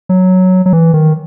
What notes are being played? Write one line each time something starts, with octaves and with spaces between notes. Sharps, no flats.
F#3
F#3
E3
D#3